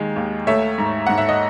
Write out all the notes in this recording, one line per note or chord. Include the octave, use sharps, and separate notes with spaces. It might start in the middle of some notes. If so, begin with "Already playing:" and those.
Already playing: D#2 D#3 G#3
D#2
A3 C#5 E5
G#2
G#2 F#5
E5
D#5